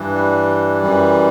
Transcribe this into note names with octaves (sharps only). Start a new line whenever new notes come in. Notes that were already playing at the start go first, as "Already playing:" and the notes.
Already playing: G2 E3
G3
F#2 E3